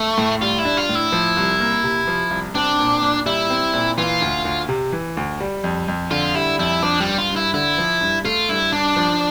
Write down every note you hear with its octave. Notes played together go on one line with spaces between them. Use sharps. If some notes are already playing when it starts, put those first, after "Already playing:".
Already playing: A3
A2
G3 F4
E4
D4
F4
A2
E4
F3
C2
A#3
C3
F3
C2
C4 D4
A#2
A#2
G3 E4
C4
A#2
E3 F4
D2
D2
C3
E3
D2
G3
F2
F2
D3 F4
G3 E4
F2 E4
F3 D4
G3
G2
F4
G2
E4
D3 E4
F3
G2
A3 F4
G2 E4
G2 D4
F3